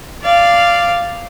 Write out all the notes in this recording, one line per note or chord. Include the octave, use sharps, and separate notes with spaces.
D5 F5